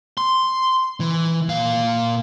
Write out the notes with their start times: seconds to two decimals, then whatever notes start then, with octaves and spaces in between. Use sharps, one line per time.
0.17 C6
1.00 E3
1.49 A#2 F5